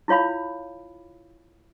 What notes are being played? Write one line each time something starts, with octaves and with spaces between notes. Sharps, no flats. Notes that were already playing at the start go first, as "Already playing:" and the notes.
E4 F4 C#5 F5 B5